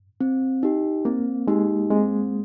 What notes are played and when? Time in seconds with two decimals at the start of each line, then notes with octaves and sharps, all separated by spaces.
0.21 C4
0.63 D#4 G4
1.05 A#3 C4
1.47 G#3 D#4 G4
1.91 G#3 C4